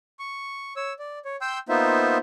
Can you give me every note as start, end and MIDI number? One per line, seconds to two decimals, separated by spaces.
0.19 0.73 85
0.76 0.93 73
0.76 0.93 88
0.99 1.19 74
1.25 1.36 73
1.41 1.59 79
1.41 1.59 84
1.41 1.59 88
1.41 1.59 91
1.69 2.18 58
1.69 2.18 59
1.69 2.18 63
1.69 2.18 65
1.69 2.18 72
1.69 2.18 76